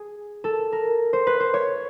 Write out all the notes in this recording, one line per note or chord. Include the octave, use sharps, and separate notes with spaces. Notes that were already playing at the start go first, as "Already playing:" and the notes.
Already playing: G#4
A4
A#4
C5
B4
C5
C#5